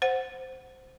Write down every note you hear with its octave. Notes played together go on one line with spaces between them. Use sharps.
C5 F#5